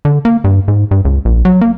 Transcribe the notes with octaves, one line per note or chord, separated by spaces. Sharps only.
D3
A#3
G2
G#2
G2
C#2
A#1
F#3
A#3